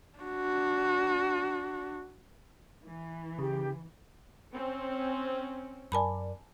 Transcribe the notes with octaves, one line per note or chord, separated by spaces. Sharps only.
D4 F#4
E3
C#3 G4
C4 C#4
F#2 A#4 D5 G#5 A5 B5